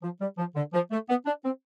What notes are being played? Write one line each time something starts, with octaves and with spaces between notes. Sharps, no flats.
F3
G3
F3
D3
F3
A3
B3
D4
C4